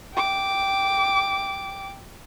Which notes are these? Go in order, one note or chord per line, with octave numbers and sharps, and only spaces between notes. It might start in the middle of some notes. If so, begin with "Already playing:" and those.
G5 D6